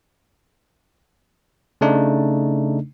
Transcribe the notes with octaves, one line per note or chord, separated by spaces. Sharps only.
C#3 A3 D4 D#4